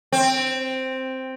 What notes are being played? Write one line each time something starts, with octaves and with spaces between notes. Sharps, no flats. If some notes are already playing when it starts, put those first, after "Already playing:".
C4